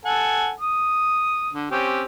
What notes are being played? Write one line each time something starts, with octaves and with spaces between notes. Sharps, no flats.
A4 F#5 G#5
D#6
D3
C4 C#4 G4